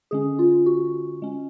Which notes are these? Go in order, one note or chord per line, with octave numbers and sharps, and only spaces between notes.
D3 G#3 C#4 G#4
F4
F#4
G#3 C#4